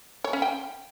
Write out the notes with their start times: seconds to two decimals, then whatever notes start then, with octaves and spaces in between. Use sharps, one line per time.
0.24 C#5
0.33 C#4
0.42 G5